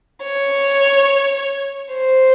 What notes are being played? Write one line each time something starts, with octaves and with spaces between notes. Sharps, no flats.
C#5
C5